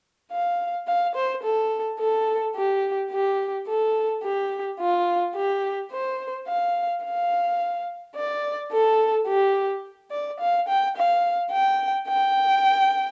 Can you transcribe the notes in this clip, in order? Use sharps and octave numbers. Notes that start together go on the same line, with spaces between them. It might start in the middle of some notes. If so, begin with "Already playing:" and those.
F5
F5
C5
A4
A4
G4
G4
A4
G4
F4
G4
C5
F5
F5
D5
A4
G4
D5
F5
G5
F5
G5
G5